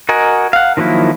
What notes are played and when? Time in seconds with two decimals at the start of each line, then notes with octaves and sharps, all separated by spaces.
0.09 F#4 A#4 D#5 G#5
0.53 F5 F#5
0.77 D#3 F3 F#3 A#3 E4